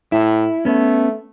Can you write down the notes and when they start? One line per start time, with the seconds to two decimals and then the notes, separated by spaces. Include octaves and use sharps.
0.12 A2 E4
0.65 A3 B3 C#4